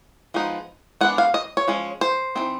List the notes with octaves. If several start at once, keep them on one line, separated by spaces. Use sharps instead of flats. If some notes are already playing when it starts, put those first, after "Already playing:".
F3 G#3 B3 D#4
G#3 B3 D4 F#5
F5
D#5
C#5
F3 G#3 C#4
C5
E3 A3 C4 D#4